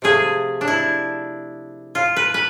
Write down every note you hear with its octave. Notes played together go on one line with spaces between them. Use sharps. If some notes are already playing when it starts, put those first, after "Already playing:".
C3 F3 A3 G#4
D4
E4
F4
B4
B4